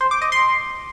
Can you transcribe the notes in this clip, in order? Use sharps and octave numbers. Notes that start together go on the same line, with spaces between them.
C5
D6
D#5
C6